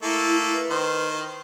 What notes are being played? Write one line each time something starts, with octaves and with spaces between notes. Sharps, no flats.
A3 A#3 E4 A4
B4
D#3 C5